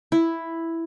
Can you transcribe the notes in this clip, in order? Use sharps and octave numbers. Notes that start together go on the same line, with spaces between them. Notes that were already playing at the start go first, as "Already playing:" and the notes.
E4